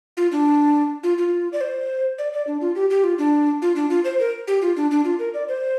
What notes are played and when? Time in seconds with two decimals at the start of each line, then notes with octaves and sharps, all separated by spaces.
0.17 F4
0.32 D4
1.03 F4
1.18 F4
1.53 D5
1.61 C5
2.18 D5
2.33 D5
2.47 D4
2.61 F4
2.75 G4
2.90 G4
3.04 F4
3.18 D4
3.62 F4
3.76 D4
3.90 F4
4.05 C5
4.19 A#4
4.48 G4
4.62 F4
4.77 D4
4.91 D4
5.05 F4
5.19 A#4
5.34 D5
5.48 C5